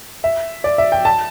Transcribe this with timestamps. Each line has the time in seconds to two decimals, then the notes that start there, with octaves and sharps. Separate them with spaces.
0.24 E5
0.64 D5
0.78 E5
0.92 G5
1.05 A5